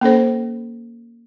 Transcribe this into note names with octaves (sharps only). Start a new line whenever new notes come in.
A#3 C#4 A4 C5